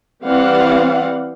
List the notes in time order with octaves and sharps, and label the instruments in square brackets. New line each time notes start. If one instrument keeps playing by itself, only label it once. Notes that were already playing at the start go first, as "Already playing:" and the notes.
[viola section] E3 G3 C4 D5 F5 F#5